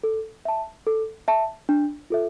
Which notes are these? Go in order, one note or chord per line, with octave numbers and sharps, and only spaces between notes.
A4
E5 A5
A4
E5 A5
D4
F4 A4 E5